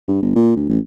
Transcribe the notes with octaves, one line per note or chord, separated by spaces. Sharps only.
G2
G1
A#2
D2
A1